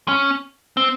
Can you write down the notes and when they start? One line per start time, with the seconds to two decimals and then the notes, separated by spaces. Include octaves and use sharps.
0.08 C#4
0.77 C4